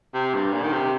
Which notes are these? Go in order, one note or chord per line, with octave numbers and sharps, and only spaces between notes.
C3
G2
A#2
D#3
C3